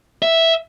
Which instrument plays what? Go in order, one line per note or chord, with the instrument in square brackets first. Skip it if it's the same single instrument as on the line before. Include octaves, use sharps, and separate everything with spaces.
[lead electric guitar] E5